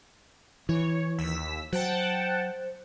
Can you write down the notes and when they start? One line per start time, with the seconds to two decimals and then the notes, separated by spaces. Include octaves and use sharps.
0.69 E3 C#5
1.18 D#2 E6 B6
1.73 F#3 C5 F#5 G5 A5